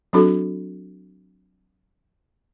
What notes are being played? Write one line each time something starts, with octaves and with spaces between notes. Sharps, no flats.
F#3 C4 D4 F#4 A4